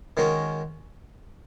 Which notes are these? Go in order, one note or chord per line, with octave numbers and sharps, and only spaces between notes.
D#3 G#3 C#4 F#4 A#4